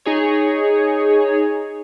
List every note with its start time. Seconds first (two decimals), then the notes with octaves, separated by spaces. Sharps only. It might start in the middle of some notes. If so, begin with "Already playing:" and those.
0.05 D#4 G#4 C#5